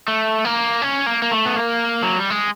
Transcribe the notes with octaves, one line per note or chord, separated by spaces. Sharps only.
A3
A#3
C#4
A#3
A#3
A3
B3
A#3
F#3
G3
G#3